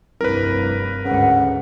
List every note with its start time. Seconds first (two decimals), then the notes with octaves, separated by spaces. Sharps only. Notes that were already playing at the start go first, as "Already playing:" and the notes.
0.21 F1 C2 G2 A#4 B4
1.05 D2 G#2 C#3 F#5